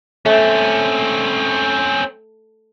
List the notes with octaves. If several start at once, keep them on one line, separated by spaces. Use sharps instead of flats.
A3 C4 C#4